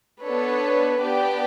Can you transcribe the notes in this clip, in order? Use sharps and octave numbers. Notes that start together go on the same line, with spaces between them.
B3 D4 A4 B4 C#5
B3 D4 G4 D5 G5